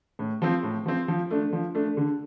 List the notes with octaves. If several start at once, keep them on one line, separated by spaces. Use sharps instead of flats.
A2
F3 C4
A2
F3 C4
F3
A3 D4
F3
A3 D4
D3